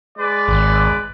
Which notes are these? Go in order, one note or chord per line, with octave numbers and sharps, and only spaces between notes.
G#3 B4 D5
G#1